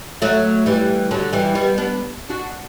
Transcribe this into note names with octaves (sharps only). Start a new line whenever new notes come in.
F#3 A3
E3 G3
D3 F#3
E3 G3
G3 B3
B3 D4
D4 F#4